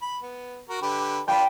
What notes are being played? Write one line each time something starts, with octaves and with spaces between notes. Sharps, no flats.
B5
B3
F#4 A#4
D3 G4 B4
D4 F4 B4 G5 B5